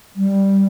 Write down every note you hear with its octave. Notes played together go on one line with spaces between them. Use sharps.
G3